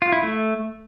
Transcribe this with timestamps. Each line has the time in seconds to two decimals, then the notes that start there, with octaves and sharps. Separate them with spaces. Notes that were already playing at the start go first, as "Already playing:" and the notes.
0.02 F4
0.12 E4
0.23 A3